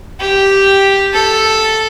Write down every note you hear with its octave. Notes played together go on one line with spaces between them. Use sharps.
G4
A4